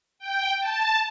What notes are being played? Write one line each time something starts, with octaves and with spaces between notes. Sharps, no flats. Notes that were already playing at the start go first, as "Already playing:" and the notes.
G5
A5